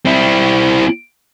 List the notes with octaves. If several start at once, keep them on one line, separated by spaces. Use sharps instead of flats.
C4 E4